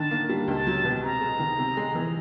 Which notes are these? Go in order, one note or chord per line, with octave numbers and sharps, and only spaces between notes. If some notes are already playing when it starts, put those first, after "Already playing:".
Already playing: D3 D#3 A5
A#3
G3
C#2 A5
F#3
B2
C3 A#5
G#3
D#3
C3
G#3
E3